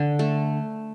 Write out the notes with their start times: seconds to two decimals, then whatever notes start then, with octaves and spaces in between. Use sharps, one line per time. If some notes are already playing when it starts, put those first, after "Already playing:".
Already playing: D3
0.19 A3